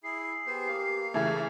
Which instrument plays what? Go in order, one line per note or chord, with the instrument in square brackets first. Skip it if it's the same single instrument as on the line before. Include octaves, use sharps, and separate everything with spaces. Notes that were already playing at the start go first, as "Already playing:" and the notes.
[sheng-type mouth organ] E4 G#4 [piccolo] C7
[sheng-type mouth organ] B3 G#4 C5 [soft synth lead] G4
[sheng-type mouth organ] A#3 F5
[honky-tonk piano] C#3 E3 A3 [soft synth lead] G#4 [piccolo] G#6